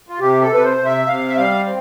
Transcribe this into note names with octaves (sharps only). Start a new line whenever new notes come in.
F4
C3 G4
A4
C3 B4
C5
C3
E5
C3 F5
E5
G3 F5
C4